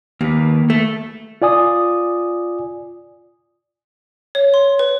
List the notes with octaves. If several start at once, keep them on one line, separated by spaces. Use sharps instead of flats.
D#2 A#3 B4
A3
F4 D5 G#5 D#6
C#5
C6
B4